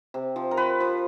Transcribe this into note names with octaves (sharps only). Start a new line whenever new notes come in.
C3
F3
A#4
F3 B4
F3